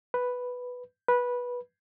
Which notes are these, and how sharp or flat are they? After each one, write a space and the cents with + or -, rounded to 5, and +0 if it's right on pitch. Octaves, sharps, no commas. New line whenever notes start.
B4 +0
B4 -15